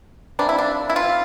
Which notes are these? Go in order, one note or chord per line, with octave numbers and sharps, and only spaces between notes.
C3 G3 A#3 D4
E4
D4
E4
F4